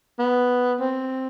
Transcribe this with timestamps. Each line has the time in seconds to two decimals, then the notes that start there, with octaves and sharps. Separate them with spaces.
0.19 B3
0.81 C4